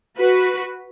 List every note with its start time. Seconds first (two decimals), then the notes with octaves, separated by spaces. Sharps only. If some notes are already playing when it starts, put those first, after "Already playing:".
0.19 F#4 B4